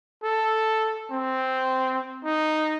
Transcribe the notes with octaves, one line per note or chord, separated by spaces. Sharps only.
A4
C4
D#4